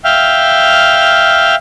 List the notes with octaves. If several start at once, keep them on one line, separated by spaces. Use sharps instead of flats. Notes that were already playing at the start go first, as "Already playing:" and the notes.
E5 F5 G5 F6